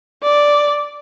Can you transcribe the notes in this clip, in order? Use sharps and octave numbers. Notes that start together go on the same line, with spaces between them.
D5